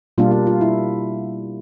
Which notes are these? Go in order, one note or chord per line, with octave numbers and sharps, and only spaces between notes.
B2 G3 A#3 D4 F4
F4
F4
E4